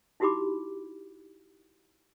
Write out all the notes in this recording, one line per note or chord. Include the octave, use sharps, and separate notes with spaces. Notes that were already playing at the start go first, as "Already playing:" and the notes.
D#4 E4 F#4 G4 B5 D6